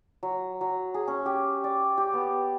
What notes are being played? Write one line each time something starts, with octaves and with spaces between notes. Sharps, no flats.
F#3
F#3
G#4
C#4
G4
D5
G4
B3